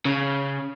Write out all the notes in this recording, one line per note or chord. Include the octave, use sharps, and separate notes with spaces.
C#3